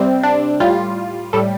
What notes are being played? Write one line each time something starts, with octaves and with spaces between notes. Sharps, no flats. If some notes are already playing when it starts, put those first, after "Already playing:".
Already playing: C3 G3 C4
D4
A2 G3 F4
A2 G3 A4